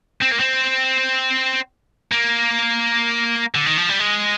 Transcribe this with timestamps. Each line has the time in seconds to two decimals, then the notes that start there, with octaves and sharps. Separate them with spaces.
0.22 C4
0.32 A#3
0.40 C4
2.12 A#3
3.55 D3
3.66 D#3
3.77 F3
3.89 G3
4.00 G#3